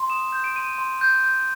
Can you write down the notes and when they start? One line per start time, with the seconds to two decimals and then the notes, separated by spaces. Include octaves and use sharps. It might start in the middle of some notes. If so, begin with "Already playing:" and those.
Already playing: C6
0.10 D#6 E7
0.32 G6
0.44 D7
0.56 C6 D#7
0.78 C6
1.01 G6
1.24 G6